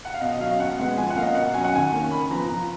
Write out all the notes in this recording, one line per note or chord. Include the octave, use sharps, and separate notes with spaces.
F#5
F5
B2 D#5
D#5
F#3 C#4 F5
B2 F#5
G#3 B3 F#5
F3 G#5
F#5
A#3 C#4 F5
D#5
B2 F#5
F#3 C#4 G#5
F#5
D#3 G#5
A#3 C#4
C#3 B5
F3 B3 A#5
F3 A#5